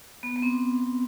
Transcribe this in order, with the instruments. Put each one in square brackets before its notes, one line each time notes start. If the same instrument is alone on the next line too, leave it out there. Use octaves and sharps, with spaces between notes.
[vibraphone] B3
B3
C4